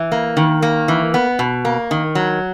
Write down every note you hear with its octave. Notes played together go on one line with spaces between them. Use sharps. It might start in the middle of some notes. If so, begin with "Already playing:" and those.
Already playing: E3
A#3
D#3
A#3
E3
B3
B2
A#3
D#3
F#3